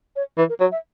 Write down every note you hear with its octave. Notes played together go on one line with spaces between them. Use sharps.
C#5
E3 B4
A#4
F#3 C#5
E5